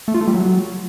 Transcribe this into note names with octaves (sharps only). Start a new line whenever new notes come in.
A3
F4
A3
G3
F#3